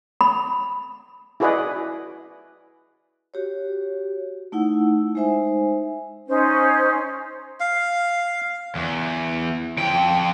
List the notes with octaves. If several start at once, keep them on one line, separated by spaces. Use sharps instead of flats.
B5
E4 F#4 G#4 B4 D5 D#5
F#4 G4 C#5
A3 D#4 E4 F#5 E6
G#3 D#4 C5 E5 G#5
C#4 D#4 C5
F5
E2
F2 G5